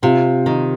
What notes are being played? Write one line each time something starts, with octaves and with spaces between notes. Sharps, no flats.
C3 F4
D#3